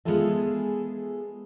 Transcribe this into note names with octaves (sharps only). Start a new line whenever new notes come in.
G#3 B3 F4 G#4 A4 E5